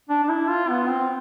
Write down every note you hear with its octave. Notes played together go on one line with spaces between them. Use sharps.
D4
D4
E4
F4
B3
C4